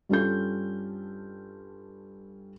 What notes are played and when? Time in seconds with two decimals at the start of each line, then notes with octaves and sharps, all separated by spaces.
0.09 G2 G3 C#4 F4 A4 G6